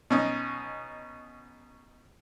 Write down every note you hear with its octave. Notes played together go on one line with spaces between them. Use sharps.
B2 C#4 D#4